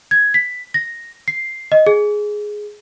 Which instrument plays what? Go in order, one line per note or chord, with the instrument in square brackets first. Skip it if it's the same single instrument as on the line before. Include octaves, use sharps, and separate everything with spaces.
[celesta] G#6
B6
A#6
C7
D#5
G#4